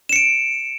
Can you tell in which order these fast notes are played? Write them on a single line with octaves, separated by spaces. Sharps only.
E7 C#7 D7